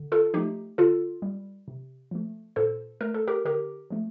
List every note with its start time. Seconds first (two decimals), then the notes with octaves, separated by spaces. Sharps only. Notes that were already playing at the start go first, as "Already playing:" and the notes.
Already playing: D3
0.12 F4 A4
0.34 F3 A3 D#4 G4
0.78 D3 F4 A4
1.22 G3
1.68 C3
2.11 F3 A3
2.56 A#2 A4 C5
3.01 A3 A#4
3.14 A4
3.28 G4 A#4
3.45 D3 G4 A#4
3.90 F3 A3